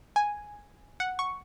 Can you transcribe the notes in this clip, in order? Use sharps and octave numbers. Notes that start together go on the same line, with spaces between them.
G#5
F#5
C#6